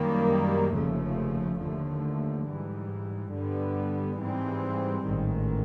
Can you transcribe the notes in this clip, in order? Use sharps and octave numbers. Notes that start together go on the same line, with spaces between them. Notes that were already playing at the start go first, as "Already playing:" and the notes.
Already playing: F#2 D#3 G3 A#3
F1 D#2 C#3 F3 A3
D#2 D3 F3 A3
G#2 E3 G3
G2 D3 G3 B3
G#2 E3 G3 C4
A1 G#2 D#3